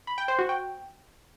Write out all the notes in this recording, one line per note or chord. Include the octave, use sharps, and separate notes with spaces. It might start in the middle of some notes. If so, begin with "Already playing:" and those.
B5
G5
C5
F#4
G5